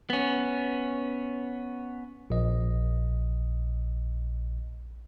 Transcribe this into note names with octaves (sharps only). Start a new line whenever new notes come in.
B3 C#4
A#1 D#5